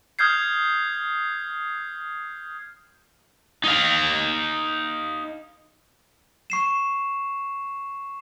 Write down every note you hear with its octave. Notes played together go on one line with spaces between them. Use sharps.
D#6 F6 G6 G#6 C7
D#4 F5
C#6 C7 E7